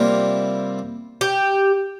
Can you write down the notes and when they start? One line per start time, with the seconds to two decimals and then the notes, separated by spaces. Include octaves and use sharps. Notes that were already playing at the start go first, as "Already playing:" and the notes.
Already playing: C3 G3 A#3 E4 F4
1.21 G4